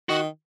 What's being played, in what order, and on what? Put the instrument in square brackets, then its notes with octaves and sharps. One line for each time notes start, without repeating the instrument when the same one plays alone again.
[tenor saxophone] D#3 [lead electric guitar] F#4